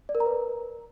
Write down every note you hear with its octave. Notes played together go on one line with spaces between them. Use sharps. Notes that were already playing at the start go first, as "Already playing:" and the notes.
D5
A#4
A#5
B4